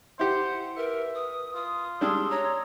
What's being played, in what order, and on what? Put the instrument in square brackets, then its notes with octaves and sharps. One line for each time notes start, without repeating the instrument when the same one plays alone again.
[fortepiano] E4 G4 [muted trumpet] C5 [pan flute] F#5
[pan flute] A#4 [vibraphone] B4 [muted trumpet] E5
[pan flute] D#6
[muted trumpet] F4 [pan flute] D#6
[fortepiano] G3 G#3 D4 [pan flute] C6 [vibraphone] D#6 E6
[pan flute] C#5 [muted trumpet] A#5